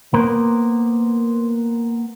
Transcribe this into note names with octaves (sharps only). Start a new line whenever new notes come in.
A#3 B3 A#4 C5